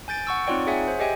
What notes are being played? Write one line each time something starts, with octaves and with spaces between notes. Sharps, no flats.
G#5 G6 A6 D7
F#5 C#6 E6 D7
C4 D#4 F4 C#5 D5 G5
G#4 C#5 E5 F#5 G#5
C5
G4 G#4 D#5 E5 G5 G#5